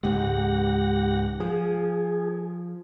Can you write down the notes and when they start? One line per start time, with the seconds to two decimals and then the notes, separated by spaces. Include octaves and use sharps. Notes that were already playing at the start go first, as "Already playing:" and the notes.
0.03 C#2 G#2 G#3 G4 F#5 A#6
1.40 F3 G#4